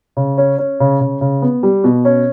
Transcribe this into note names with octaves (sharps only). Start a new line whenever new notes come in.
C#3
C#4
C#4
C#3
C#3
C#3
B3
G3
B2
C#4